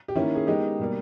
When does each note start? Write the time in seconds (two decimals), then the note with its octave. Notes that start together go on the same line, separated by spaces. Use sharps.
0.08 G4
0.15 D#3 A#3 C#4 E4
0.35 G#4
0.47 D#3 G#3 B3 D#4 G4
0.79 B2 G3 A#3